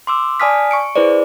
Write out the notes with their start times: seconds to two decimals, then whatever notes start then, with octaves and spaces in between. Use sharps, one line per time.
0.07 C6 D6 E6
0.40 D5 G#5 A5 D#6 F6 B6
0.71 C#6 C#7 D7
0.96 E4 G#4 B4 C5 D5